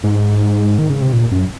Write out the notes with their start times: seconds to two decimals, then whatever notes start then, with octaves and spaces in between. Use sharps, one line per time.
0.04 G#2
0.79 D#3
0.90 C#3
1.02 C3
1.12 A#2
1.32 F#2